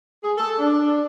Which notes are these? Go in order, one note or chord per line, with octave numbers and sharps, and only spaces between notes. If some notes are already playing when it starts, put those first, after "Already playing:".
G#4
A4
D4